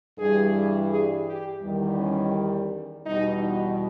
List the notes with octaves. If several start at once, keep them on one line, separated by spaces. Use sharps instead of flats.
G2 E3 G3 G#4
G#4
G4
E2 D#3 G3
C#4
E2 B2 G3 D#4